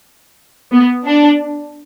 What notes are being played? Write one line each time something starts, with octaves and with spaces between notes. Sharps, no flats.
B3
D4